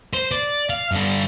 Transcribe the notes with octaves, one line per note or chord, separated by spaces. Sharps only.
C5
D5
F5
G2 D3